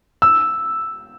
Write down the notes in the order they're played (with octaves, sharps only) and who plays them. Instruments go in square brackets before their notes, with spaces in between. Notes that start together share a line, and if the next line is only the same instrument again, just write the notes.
[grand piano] E6